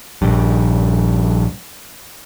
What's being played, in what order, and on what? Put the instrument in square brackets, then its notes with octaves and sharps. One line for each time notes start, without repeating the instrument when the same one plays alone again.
[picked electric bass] A#1 G2